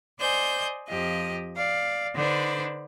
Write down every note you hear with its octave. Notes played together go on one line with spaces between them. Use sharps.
C5 D5 D#5 G#5 G6
F2 F3 G4 D#5
D5 F5
D3 D4 D#4 B4 C5 D5